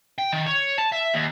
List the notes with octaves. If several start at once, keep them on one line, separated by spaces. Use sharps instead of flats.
G5
D#3
C#5
A5
E5
D#2